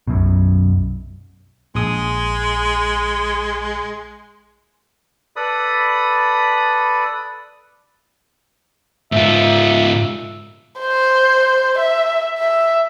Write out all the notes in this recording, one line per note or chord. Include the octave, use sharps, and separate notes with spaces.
B1 F#2 B2
A#1 G#3 D#6
A4 B4 D5 B5 D#6
G#2 F4 E5
C5
E5
E5